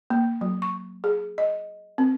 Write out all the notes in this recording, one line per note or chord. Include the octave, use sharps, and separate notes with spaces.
A#3
F#3
C#6
G#4
D#5
C4